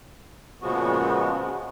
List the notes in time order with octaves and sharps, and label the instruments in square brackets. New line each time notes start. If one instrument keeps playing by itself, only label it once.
[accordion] A#2 C#3 F3 G#3 B3 F#4